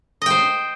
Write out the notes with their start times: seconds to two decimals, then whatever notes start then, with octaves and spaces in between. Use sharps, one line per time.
0.22 D#5
0.26 G5
0.30 C5